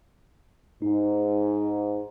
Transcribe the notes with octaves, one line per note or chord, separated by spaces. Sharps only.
G#2 D#4